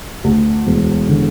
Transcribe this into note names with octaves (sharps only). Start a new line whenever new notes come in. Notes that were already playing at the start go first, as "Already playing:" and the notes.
D2
E1
D3